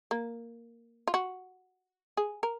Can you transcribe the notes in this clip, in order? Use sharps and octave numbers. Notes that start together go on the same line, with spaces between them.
A#3
F4
F#4
G#4
A#4